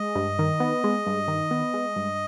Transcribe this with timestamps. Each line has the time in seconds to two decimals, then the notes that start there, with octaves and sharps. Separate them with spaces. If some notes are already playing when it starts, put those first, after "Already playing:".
Already playing: G#3 D#5
0.15 G2
0.39 D#3
0.60 B3
0.84 G#3
1.06 G2
1.28 D#3
1.51 B3
1.74 G#3
1.96 G2